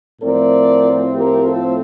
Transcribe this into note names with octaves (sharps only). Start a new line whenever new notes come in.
A2 F3 A3 C4 A#4 D5
G4 A#4
F4 A4